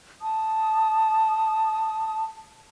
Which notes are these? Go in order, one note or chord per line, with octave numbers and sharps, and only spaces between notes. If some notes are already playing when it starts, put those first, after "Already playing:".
A5 D#6